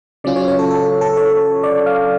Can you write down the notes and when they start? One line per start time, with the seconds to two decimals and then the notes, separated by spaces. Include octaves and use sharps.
0.24 C#3 F#3 C#4 F4 D5
0.36 C#5
0.48 C#5
0.59 A4
0.71 A4
1.01 A4
1.17 C#5
1.63 D5
1.86 F5